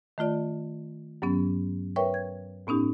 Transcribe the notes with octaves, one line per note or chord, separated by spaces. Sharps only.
D#3 A3 F4 D5
G2 F#3 B3 C#4
A#4 B4 C#5 E5 G5 C#6
G#6
A2 B3 C#4 D#4 G4